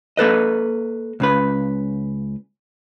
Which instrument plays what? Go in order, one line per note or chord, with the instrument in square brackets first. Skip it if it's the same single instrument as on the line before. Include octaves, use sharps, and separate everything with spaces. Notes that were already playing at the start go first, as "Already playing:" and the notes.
[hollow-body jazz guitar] A#3 A4 B4 D#5
C#2 C#3 B4